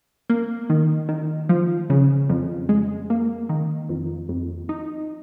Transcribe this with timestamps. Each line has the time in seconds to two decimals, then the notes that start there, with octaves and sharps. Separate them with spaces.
0.30 A#3
0.70 D#3
1.09 D#3
1.49 F3
1.90 C#3
2.29 F2
2.69 G#3
3.10 A#3
3.49 D#3
3.89 F2
4.29 F2
4.69 D#4